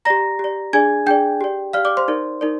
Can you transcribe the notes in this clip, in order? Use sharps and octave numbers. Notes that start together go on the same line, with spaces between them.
G4 D5 A#5 A#6
G4 D5
D4 G#4 D5 G#5 G#6
D4 G#4 D5 G5 G6
G4 D5
G4 D5 F5 F6
D5 D6
C5 C6
D#4 A#4 D5
D#4 A#4 D5